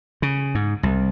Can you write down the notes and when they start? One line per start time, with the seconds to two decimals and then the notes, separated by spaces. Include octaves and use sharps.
0.22 C#3
0.55 G#2
0.83 C2